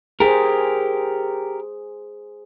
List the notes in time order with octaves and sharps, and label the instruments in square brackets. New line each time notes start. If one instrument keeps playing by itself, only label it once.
[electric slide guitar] G4 A#4 [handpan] G#4 C5